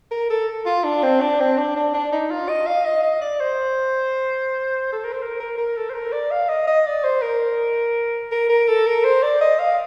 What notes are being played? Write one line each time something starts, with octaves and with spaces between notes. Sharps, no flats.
A#4
A4
F4
D4
C4
D4
C4
D4
D4
D4
D#4
F4
D#5
F5
D#5
D#5
D5
C5
A4
A#4
C5
A#4
A#4
A#4
A4
C5
A#4
D5
F5
D#5
D#5
D5
C5
A#4
A#4
A#4
A4
A#4
C5
D5
D#5
F5